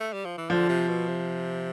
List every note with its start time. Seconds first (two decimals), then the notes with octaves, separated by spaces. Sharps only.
0.00 A3
0.13 G3
0.25 F3
0.38 E3
0.50 D3 F3
0.69 C3
0.88 B2
1.08 C3